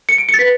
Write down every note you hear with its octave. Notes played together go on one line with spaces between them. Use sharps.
C#7
D7
C#7
A6
B4 B6